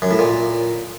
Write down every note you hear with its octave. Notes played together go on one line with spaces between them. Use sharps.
F#2
A2
A#2